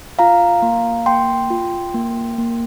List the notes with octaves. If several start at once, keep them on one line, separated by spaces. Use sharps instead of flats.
F4 F5 A#5
A#3
A#3 G5 C6
F4
A#3
A#3